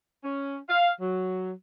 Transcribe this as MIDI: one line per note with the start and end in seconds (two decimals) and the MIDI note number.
0.24 0.57 61
0.69 0.91 77
1.01 1.51 54